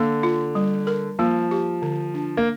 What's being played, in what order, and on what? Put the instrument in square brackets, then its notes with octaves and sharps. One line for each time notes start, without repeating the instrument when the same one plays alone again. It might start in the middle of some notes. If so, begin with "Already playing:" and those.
Already playing: [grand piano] D3 [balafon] A#3
[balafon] F4
G3
A#4
[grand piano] F3 [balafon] A#3
[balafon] G4
D3
D4
[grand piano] A#3